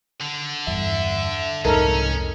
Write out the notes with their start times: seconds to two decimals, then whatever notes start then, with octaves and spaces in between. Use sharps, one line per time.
0.21 D3
0.67 E2 G2 E3 E5
1.65 C2 F2 G#2 C#4 D#4 A4 A#4